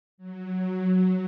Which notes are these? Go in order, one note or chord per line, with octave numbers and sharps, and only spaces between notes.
F#3